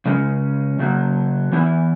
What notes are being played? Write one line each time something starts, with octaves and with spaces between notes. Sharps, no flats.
C#3 G#3 C#4
C#3 F#3 A#3
E3 B3 E4